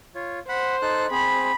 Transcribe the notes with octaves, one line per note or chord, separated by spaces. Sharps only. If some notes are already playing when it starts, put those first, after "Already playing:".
F4 C#5
C5 F#5 B5
D#4 A4 F#6
C4 G#4 B5